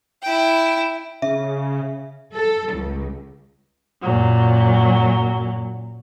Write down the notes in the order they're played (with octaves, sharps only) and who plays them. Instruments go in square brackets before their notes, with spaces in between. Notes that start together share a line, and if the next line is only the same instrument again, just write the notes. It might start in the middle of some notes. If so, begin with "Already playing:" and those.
[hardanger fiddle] E4 G5
[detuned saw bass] C#3 [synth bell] E5
[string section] A4
C#2
[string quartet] F#2 A#2 F#3